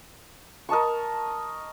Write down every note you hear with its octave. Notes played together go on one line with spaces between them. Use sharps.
A#4 D#5 A5 C#6